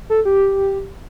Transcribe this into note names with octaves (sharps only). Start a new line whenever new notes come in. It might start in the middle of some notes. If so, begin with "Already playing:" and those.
A4
G4